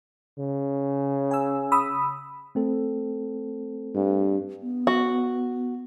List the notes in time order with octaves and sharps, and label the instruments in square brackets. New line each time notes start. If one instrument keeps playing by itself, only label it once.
[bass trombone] C#3
[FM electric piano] G#5 E6
B5 D#6 E6
[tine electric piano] A3 C4 A4
[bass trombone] G2
[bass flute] B3
[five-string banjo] F#4